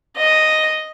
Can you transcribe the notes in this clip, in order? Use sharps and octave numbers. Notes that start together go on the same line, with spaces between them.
D#5